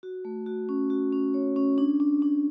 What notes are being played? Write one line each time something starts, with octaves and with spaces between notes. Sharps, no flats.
F#4
A3
F#4
C#4
F#4
C#4
C#5
C#4
D4
D4
D4